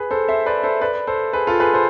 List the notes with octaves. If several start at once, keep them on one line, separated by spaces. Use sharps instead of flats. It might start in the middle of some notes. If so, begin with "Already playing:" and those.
Already playing: G#4 B4
A4 C5
C5 E5
B4 D5
A4 C5
B4 D5
A4 C5
G#4 B4
F4 A4
G#4 B4
A4 C5